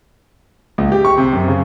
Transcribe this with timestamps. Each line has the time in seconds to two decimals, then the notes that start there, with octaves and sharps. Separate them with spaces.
0.78 C#2
0.92 G4
1.05 C#6
1.18 C3
1.33 F#2
1.48 C#3